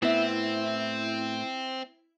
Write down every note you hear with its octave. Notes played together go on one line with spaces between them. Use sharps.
A2 B3 C4 E4 E5